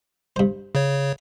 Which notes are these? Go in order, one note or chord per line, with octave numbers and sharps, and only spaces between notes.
G2 C5
C#3 C#5